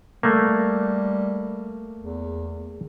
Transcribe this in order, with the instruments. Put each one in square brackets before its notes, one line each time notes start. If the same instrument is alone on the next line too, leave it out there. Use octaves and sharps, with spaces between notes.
[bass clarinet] G3 [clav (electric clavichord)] A3 A#3
[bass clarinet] E2